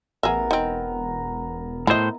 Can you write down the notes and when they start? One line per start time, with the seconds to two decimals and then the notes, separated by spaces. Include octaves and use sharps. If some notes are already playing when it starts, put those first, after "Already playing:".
0.23 A1 B3 G#4 A#4 E5
0.51 E1 C4 D#4
1.87 A2 E4 C5 D#5